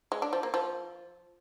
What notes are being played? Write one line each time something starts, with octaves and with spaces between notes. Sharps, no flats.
G#3
D4
F3
A#3
F3